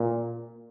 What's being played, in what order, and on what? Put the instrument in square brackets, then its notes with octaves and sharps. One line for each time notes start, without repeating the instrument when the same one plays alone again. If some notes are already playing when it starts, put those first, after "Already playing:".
Already playing: [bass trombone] A#2